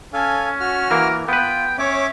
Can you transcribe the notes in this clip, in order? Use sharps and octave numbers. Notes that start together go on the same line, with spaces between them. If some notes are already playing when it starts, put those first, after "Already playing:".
C#4 A4 F5 G#5
F#4 F6
E3 A#3 A#4
B3 F4 B4 G5
C#4 C#5 E5 D6